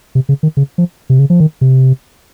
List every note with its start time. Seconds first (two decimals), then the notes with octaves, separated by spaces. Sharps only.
0.15 C3
0.29 C#3
0.43 D#3
0.57 C#3
0.78 F3
1.10 C3
1.19 C#3
1.30 F3
1.40 D#3
1.61 C3